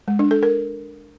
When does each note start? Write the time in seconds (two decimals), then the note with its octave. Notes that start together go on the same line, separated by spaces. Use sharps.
0.08 G#3
0.19 D4
0.31 A4
0.43 A#4